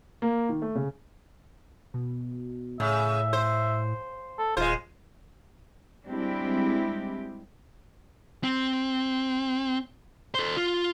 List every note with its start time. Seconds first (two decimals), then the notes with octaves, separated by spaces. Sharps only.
0.22 A#3
0.49 D#3
0.62 A3
0.75 C#3
1.94 B2
2.80 A2 C#3 E5
3.33 C5
4.39 A4
4.57 D#1 G#3 F4 C5
6.05 G3 G#3 C4 D4 E4 G4
8.43 C4
10.35 A4 C5
10.57 F4